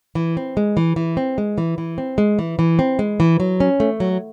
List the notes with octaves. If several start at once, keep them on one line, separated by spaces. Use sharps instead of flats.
E3
C4
G#3
E3
E3
C4
G#3
E3
E3
C4
G#3
E3
E3
C4
G#3
E3
F#3
C#4
A3
F#3